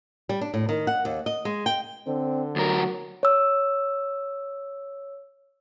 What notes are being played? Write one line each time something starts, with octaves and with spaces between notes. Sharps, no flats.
G3
D4
A2
D#3
F#5
D#2
D#5
G#3
G5
D3 C4
D2 F#3 A#4
C#5 E6